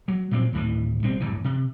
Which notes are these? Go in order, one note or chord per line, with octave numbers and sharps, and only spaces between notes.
F#3
A#2 F#3 A3 C4
D2 A2 D#3 E3
G#1 B2 G3 C4
D1 G1 G2 E3
C3